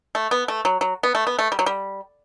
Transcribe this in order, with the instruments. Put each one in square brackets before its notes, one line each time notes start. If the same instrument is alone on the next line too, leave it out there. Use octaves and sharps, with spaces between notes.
[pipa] A3
B3
A3
F#3
F#3
B3
A3
B3
A3
G3
F#3
G3